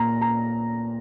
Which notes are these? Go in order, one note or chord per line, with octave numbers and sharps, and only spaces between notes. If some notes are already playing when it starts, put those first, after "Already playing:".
Already playing: A#2 A#5
A#5